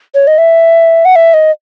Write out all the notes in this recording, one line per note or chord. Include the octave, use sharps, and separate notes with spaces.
C#5
D#5
E5
F#5
E5
D#5